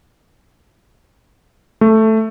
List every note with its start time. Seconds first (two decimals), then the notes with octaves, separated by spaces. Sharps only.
1.81 A3